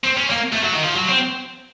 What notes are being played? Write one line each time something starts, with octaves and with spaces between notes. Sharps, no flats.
C4
C#4
A#3
A3
F#3
D#3
F3
F#3
C4